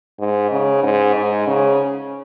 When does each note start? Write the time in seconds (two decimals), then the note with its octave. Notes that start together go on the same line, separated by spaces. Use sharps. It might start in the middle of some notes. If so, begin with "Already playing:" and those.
0.20 G#2
0.51 C#3
0.83 G#2
1.14 G#2
1.47 C#3